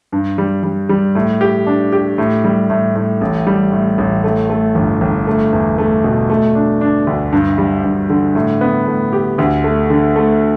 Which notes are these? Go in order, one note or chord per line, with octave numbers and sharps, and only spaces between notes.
G2
G3
G3
G3
A2
G4
D4
G4
A2
G3
A2
A2
A1
G3
A2
A1
A3
A3
G1
G1
A3
E2
A3
B2
A3
D4
D4
D2
G2
G3
G2
D3
A2
B3
A2
G4
D2
A3
D3
A3